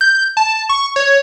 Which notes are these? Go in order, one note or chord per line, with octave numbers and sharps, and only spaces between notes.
G6
A5
C#6
C#5